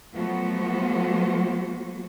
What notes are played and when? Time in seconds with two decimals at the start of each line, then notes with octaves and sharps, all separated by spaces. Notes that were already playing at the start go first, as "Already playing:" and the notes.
0.14 F3 F#3 A3 B3 F#4 C5